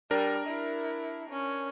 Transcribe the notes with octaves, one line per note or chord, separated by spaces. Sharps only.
G3 D4 A#4
E4
C#4